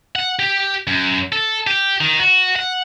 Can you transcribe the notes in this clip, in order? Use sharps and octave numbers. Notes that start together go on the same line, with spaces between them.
F#5
G4
F#2
A4
G4
D#3
F#4
F#5